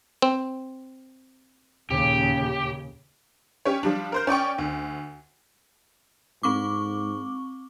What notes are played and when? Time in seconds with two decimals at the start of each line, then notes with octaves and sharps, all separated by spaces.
0.22 C4
1.91 D#2 A#2 C#3 G4
3.65 C#4 G4 C#5
3.83 F3 G3 D4
4.12 A#4 C5 G6
4.27 C#4 D5 G5 C#6
4.58 D2
6.43 G#2 C4 C#6 D6